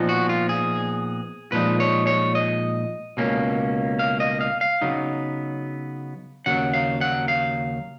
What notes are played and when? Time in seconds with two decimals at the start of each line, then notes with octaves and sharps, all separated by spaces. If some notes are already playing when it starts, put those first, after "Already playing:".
Already playing: A#2 F3 B3 D#4
0.09 F#4
0.29 F4
0.49 G#4
1.52 A#2 F3 G#3 D#4 B4
1.80 C#5
2.07 C#5
2.35 D#5
3.17 C#2 B2 A#3 C#4
3.99 F5
4.20 D#5
4.41 F5
4.61 F5
4.81 C#3 F#3 B3 D#4
6.46 D#2 C#3 F#3 F#5
6.73 F5
7.01 F#5
7.28 F5